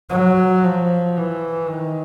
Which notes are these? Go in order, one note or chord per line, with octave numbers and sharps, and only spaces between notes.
F#3
F3
E3
D#3